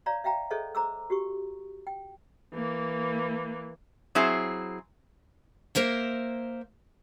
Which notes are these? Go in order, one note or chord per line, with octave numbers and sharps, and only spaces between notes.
C#5 D5 F5 A#5
E5 F5 G5 A#5
G#4 A4 C5 C#5 D#5 E5
C5 A#5 D6 E6
F#4 G4 C#6
G5
E3 A#3
F#3 C4 E4 G#4
A#3 A#4 C5 E5